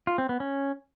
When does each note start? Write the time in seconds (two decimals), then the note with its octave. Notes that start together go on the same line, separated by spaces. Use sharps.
0.07 F4
0.18 C4
0.29 B3
0.40 C#4